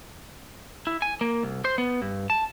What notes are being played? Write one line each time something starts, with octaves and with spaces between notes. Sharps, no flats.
E4
G#5
A#3
C2
C5
B3
G2
A5